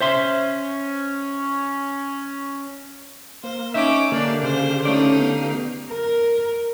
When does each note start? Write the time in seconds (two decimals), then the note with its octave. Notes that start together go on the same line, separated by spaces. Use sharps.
0.01 C#4 C5 E5 C6
3.43 A#3 C5
3.74 C#4 D#4 E5 D6
4.12 D3 A#3 D4 G4 D5 F5
4.43 C#3 C5
4.85 A3 C#4 D#4 D5
5.19 B3
5.91 A#4